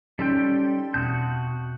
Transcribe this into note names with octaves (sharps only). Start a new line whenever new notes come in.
G3 C#4 D#4 A4 D5 G5 C6
E2 B2 C4 F#4 E5 A5 D#6 G6